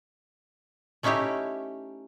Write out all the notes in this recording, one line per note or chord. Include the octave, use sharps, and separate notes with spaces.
A3 C#4 D#4 E4 G4 C#5